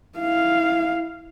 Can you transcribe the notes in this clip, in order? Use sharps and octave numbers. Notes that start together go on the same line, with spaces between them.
E4 F5